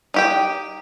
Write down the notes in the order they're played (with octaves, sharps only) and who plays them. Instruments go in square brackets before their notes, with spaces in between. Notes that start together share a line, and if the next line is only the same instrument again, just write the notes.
[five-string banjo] D#4 G4 G5